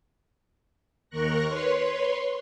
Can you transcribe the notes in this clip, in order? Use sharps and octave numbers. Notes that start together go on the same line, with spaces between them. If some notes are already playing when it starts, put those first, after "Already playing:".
D#2 A#4 C#6 F#6 A#6
B4 C#5 C6